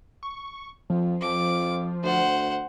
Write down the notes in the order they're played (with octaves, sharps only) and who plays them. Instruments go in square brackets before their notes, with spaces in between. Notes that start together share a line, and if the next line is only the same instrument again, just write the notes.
[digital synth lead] C#6
[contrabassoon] F2 [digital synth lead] F3
[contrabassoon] F2 [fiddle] D6
[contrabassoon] D2 [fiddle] C5 F#5